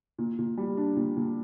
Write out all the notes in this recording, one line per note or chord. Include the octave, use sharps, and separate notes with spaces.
A#2
A#2
G3
D4
A#2
A#2